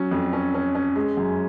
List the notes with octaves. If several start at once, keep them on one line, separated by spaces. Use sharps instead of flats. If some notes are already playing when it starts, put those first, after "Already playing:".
Already playing: F#3 C#4
F2
C#4
C#4
C#4
G#3
F#2